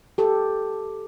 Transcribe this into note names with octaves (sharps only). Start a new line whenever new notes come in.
G4 A4